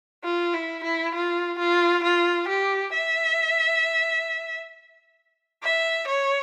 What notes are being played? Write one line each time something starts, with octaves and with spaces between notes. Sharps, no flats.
F4
E4
E4
F4
F4
F4
G4
E5
E5
C#5